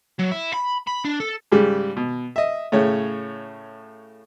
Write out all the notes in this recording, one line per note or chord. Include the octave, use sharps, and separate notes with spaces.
F#3
E4
B5
B5
D4
A4
G#2 C#3 G3
B2
D#5 E5
A2 C#3 C#5